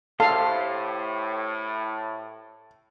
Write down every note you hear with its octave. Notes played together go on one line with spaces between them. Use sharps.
A2 G4 A4 C5 F5 A5 C6